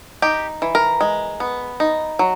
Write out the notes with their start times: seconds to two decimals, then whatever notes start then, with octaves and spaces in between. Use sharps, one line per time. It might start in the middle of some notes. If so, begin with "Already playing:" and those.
0.22 D#4 G4
0.62 E3
0.75 A#4
1.01 G#3
1.40 B3
1.80 D#4
2.19 F#3